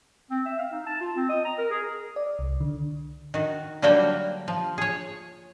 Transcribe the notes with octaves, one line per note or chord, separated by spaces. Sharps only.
C4
E5
F5
D#4
A5
F4
C4
D#5
A#5
A#4
G#4
D5
C2
D3
D#3 F#4
D3 F#3 G3 A#3 F#4 G5
F3
G#4 C#5